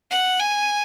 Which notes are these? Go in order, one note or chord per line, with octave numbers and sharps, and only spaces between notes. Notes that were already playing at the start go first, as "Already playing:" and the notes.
F#5
G#5